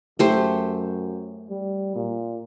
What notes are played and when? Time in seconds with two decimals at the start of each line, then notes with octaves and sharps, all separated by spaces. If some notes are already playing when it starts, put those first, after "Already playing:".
0.19 F#2 A3 G4 C5
1.50 G3
1.95 A#2